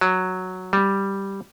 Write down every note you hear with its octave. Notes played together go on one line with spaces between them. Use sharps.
F#3
G3